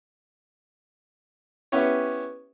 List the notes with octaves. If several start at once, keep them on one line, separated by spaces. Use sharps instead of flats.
B3 C#4 E4 G4 C#5